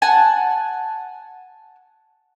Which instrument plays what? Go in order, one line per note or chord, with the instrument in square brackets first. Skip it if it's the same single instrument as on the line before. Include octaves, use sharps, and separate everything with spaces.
[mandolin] F#5 G#5 A5